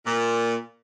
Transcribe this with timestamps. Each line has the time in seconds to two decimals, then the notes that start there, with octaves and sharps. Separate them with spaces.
0.06 A#2